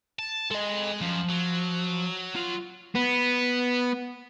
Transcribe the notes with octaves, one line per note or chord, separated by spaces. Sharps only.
A5
G#3 A4 D#5
F#2 F3
F#3
F4
B3